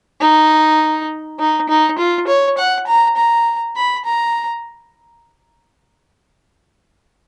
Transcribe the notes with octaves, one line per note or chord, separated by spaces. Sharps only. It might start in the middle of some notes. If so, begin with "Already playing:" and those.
D#4
D#4
D#4
F4
C#5
F#5
A#5
A#5
B5
A#5